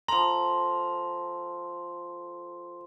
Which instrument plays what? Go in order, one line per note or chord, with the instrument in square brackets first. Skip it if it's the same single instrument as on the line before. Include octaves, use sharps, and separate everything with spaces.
[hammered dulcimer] F3 A4 [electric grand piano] A#5 [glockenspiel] C6